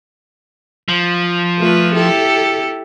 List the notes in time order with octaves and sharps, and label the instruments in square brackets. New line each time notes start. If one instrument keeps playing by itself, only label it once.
[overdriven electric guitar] F3
[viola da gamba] A3 F4 B4
E4 G4 A4